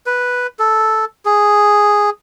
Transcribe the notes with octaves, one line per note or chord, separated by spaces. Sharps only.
B4
A4
G#4